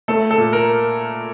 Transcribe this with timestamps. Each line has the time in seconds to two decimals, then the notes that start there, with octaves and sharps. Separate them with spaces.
0.08 A3 A4
0.31 A4
0.38 A#2
0.53 A#4